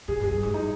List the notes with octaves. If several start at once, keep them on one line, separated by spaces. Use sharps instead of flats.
A#2 G#4
G2
G#4
G2
G#2
D#4